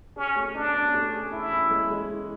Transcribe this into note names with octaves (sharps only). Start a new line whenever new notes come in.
C#4 G#4
A3
C#4 D4
C#4
A3
G#4
E3 E4
C#4
G#3
G#3
E3